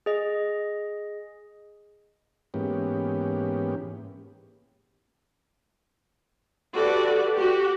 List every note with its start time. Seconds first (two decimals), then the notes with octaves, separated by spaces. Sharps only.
0.06 G#4 D#5
2.54 G#2 E3 A#3 B3 C#4 G4
6.75 F#4 G4 A4 B4 D5
7.36 F#4 G4